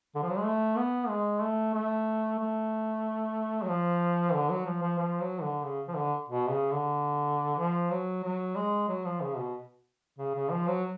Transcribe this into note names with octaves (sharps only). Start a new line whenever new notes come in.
D3
F3
F#3
G#3
A3
B3
G#3
A3
A3
A3
F#3
F3
D3
F#3
F3
F3
F3
F#3
D3
C#3
F3
D3
B2
C#3
D3
F3
F#3
F#3
G#3
F#3
F3
C#3
B2
C#3
C#3
F3
F#3